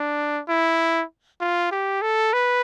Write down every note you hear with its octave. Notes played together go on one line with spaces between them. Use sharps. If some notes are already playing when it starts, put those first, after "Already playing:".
Already playing: D4
E4
F4
G4
A4
B4